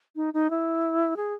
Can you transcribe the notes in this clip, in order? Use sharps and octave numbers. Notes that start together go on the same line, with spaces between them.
D#4
D#4
E4
G#4